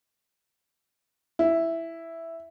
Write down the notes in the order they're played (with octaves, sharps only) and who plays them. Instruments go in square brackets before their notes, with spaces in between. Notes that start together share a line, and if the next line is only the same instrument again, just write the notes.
[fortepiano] E4